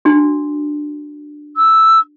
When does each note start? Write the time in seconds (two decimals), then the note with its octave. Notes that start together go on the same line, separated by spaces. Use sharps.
0.05 D4 F#4
1.56 E6